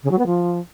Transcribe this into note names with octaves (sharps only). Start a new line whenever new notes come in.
C#3
F#3
B3
F3